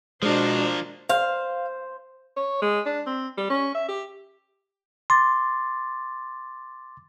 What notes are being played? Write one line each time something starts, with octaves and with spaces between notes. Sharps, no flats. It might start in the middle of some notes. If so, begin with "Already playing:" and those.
B2 F3 G#3 D4 A#4 C5
C5 F5
C#5
G#3
D4
C4
G3
C#4
E5
G4
C6 D6 A6